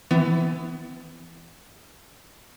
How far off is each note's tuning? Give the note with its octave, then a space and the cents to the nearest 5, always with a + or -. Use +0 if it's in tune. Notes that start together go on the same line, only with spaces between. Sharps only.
E3 +0 B3 +35